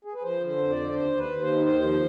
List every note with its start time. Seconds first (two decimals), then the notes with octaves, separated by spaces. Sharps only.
0.05 G#4
0.14 B4
0.23 F3 C5
0.41 D3
0.47 C5
0.58 F2
0.70 D5
0.76 D3
0.94 D#2 C5
1.12 D#2
1.18 B4
1.29 D#2
1.41 C5
1.47 D#3
1.65 D#2 C5
1.82 F3